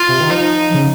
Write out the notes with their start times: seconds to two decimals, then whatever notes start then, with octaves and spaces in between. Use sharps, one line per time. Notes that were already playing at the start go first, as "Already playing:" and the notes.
Already playing: F4
0.09 C3
0.20 D#3
0.30 F3 D#4
0.74 C#3